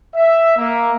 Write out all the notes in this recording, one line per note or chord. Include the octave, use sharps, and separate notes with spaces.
E5
A#3